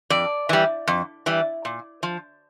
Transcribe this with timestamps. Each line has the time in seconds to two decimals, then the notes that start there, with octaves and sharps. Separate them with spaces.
0.10 F2 D5
0.49 E3 G3
0.88 F2
1.26 E3 G3
1.65 A#2
2.03 F3